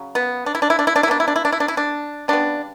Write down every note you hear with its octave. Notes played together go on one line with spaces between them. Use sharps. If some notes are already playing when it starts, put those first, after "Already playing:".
Already playing: C#3 F#3
B3
D4
E4
D4
E4
D4
E4
D4
E4
B2 A#3 D4
E4
D4
E4
D4
E4
D4
E4
D4
C#3 G3 B3 D4